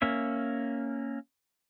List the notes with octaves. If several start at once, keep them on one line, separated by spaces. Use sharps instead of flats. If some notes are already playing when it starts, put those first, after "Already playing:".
A#3 C#4 E5